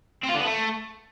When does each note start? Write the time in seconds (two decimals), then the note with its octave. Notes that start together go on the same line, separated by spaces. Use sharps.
0.23 C4
0.29 F4
0.34 D3
0.39 B3
0.45 A3